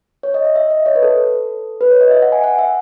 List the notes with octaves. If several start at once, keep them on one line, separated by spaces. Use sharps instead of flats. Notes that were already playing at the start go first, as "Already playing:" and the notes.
C#5
D#5
E5
E5
D#5
C#5
B4
A4
B4
C#5
D#5
E5
F#5
G#5
F#5
E5